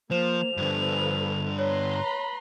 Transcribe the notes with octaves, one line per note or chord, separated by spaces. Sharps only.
F3 A#3 C5 E7 F7
G2 D3 F3 A4 B4
B4 C#5 A#5 C6
B5